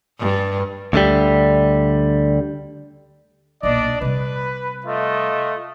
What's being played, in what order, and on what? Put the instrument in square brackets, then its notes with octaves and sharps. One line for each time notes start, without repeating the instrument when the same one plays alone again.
[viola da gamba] G2
[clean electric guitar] D2 D3 G3
[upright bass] B1 A#2 [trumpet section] D4 D5 D#5
[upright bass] C3 G3 [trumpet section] B4
[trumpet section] A3 F4 D#5